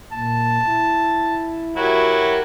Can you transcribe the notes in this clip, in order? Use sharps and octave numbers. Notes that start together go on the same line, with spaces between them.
A#2 A5
E4
F#3 E4 F#4 G4 A#4